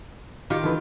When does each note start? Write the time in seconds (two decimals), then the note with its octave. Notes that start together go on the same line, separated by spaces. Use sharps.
0.50 D#3 F4 G4
0.63 D3 E3 B4